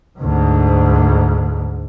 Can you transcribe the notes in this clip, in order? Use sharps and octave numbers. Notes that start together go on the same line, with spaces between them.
D2 G#2